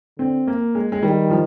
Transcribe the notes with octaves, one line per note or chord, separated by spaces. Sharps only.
D3 C4
A#3
G#3
G#3
D#3 G3
F3